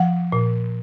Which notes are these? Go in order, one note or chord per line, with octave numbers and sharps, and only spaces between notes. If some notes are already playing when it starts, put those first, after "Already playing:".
Already playing: F3 F#5
A#2